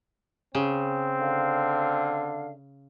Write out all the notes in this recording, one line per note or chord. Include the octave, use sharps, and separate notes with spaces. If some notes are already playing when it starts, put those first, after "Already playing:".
C#3 C4
D3 F5